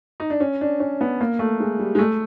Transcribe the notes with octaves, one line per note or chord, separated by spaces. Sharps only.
D#4
D4
C#4
D4
C#4
B3
A#3
A3
G#3
G3
G#3
A3